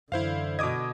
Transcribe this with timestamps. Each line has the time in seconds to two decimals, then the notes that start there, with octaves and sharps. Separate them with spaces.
0.12 F#2 D3 E3 E4 C5 F5
0.59 B2 D#5 D6 D#6 G#6